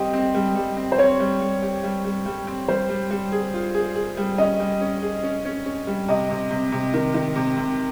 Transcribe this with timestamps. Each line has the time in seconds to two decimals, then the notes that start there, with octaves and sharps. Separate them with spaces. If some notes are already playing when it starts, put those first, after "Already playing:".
Already playing: G3 C4 G4 D#5
0.13 C4
0.35 G3
0.55 G3
0.77 C4
0.92 C5
0.98 C4 C#5
1.20 G3
1.40 G3
1.62 G4
1.83 G3
2.05 G3
2.26 G3
2.47 C4
2.68 G3 C5
2.89 G3
3.11 G3
3.32 G#4
3.54 F4
3.75 G#4
3.96 G#4
4.17 G3
4.38 C#4 D#5
4.60 G3
4.81 C#4
5.02 G#4
5.23 C#4
5.45 C#4
5.66 C#4
5.87 G3
6.08 C3 D#5
6.30 C3
6.51 C3
6.72 C3
6.94 D#3
7.14 D#3
7.36 C3
7.57 C3